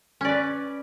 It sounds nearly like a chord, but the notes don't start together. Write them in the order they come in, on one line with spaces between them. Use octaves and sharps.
C#4 D5 B4